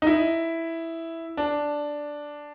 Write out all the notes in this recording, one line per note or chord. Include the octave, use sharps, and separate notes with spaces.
D#4
E4
D4